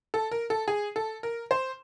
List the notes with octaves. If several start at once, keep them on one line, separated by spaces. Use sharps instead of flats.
A4
A#4
A4
G#4
A4
A#4
C5